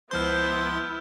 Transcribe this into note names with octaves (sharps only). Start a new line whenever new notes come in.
C#2 F3 B3 E4 C5 C6 F6 G6